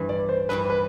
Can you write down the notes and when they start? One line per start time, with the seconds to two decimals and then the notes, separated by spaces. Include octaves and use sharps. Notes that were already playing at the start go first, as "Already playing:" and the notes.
Already playing: G2 E3 G3
0.09 D5
0.29 C5
0.49 G2 E3 G3 B4
0.70 B4